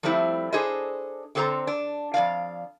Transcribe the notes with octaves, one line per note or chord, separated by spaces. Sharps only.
F3 G3 A3 C4 E4
D4 G#4 A4 C5 D#5
D3 C4 A4 C5 E5 A#5
D4
F2 A#2 D5 F5